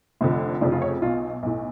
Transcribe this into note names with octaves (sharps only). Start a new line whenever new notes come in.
F1 F2 D3
F1 F2 C#3 D4
F4
C#5
B1 B2 F4
B1 A2